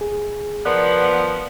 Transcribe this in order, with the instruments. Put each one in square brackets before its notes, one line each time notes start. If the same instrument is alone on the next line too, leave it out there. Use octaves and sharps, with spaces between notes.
[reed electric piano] G#4
[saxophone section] F3 B3 [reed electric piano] A#4 D5 F#6